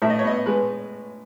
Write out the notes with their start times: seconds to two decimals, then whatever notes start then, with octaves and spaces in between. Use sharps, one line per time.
0.02 A2 E5
0.10 D#5
0.19 C#5
0.24 B3 D#5
0.46 G#3 B4